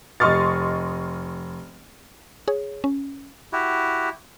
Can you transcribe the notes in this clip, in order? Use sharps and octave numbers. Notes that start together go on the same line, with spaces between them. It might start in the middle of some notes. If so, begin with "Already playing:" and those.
F1 D#5 C6 C#6 F6 A6
G#4 C#5
C#4
E4 F#4 G4